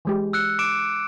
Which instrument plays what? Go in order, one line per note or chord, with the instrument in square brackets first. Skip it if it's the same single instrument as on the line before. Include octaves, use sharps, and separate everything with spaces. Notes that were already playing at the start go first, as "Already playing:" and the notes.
[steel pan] E3 G#3 G4
[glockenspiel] E6 F#6 C#7
D6 D7 E7